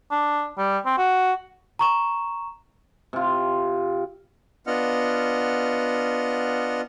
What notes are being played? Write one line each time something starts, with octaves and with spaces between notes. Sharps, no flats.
D4
G3
C4
F#4
A#5 C#6 E7
C3 F4
B3 D4 F4 D#5 F#5 F6